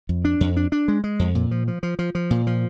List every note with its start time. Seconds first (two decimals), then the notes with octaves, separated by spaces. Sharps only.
0.09 F2
0.25 D4
0.41 F2
0.57 D4
0.72 D4
0.88 G#3
1.04 G#3
1.19 F2
1.35 A#2
1.51 F3
1.68 F3
1.83 F3
1.99 F3
2.15 F3
2.30 A#2
2.47 F3